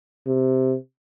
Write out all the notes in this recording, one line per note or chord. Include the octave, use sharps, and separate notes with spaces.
C3